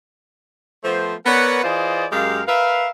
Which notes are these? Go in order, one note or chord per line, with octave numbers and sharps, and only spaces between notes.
F3 A3 B3 C5
B3 A#4 B4 C#5 D5 F#5
E3 F4 G#4 C5 D5 D#5
F#2 G#3 G4 A#4 F5
A#4 B4 E5 F5